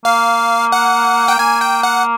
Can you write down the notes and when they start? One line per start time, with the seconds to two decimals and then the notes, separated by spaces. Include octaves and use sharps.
0.05 A#3 F5
0.72 F#5
1.28 G5
1.39 A#3 G#5
1.61 G5
1.83 F#5